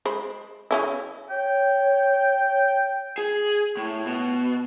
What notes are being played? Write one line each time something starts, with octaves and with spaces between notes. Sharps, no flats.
G#3 C5 B5
C#3 C#4 E4
C#5 G5
G#4
A2
B2